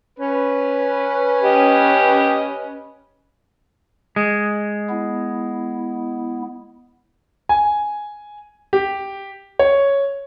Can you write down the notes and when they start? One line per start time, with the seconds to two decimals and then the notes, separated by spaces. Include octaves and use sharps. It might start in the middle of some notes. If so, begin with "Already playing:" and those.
0.19 C#4 B4
1.43 G4 D#5
4.16 G#3
4.90 B3 E4
7.49 G#5
8.73 G4
9.59 C#5